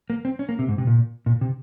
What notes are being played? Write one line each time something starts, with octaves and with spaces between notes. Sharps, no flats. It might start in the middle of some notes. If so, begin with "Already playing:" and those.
A#3
C4
C#4
A#3
C3
G#2
C3
A#2
A#2
C3